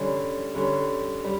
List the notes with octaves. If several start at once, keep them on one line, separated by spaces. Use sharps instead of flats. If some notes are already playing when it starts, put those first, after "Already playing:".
Already playing: D3 G3 C#4
D3 G3 C#4
G3